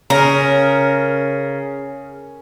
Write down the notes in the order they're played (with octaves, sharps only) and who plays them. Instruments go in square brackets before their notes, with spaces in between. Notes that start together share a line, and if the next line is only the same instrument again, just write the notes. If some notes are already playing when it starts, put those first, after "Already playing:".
[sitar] C#3 [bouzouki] A#4